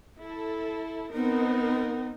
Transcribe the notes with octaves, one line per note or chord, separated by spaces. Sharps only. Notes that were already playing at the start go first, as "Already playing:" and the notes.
E4 A4
B3 C4 D#4 A#4